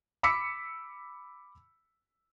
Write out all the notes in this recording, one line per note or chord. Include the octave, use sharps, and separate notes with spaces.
B5 D6 E6 B6 C#7